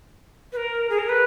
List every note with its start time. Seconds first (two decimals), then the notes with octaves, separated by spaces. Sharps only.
0.53 B4
0.57 A#4
0.90 G#4
0.99 A#4
1.09 B4